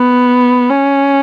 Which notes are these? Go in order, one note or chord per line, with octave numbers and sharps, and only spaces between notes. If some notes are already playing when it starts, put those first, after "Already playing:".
Already playing: B3
C#4